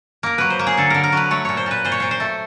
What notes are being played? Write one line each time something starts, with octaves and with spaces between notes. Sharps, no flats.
A#3 A#4
F#3 B4
C5
A#3
G#4
D3 A4
D3 A#4
A#4
F#3 B4
A3 C#5
A#2 C#5
C5
A#2 B4
A#2 C5
C#5
A#2 C5
C5
A3